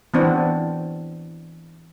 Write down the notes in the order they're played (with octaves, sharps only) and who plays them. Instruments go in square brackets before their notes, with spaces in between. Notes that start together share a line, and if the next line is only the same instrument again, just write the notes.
[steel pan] E3 B3 C4 D4